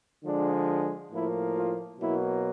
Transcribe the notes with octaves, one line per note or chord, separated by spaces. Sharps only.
D3 F3 G#3 D4
A2 F3 A#3 E4
F4
B2 F#3 A#3 E4